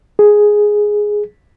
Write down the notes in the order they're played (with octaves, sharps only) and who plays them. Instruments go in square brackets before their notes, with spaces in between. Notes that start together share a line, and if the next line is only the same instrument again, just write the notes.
[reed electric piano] G#4